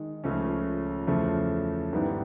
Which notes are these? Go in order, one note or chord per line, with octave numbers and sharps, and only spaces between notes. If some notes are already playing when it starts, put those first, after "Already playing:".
Already playing: D#3 G#3
C#2 C#3 F3 A3 C#4
E2 C#3 F3 A3
G#2 D#3 G3 B3 E4